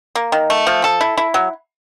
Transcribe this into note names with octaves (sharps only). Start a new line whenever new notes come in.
A#3
D#3
A3
F3
A4
E4
E4
F#3